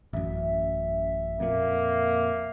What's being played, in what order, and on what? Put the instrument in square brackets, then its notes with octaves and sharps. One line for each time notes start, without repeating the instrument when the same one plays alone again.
[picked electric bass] A1 F#2 [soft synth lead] E5
[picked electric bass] F2 A#2 [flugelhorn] A#3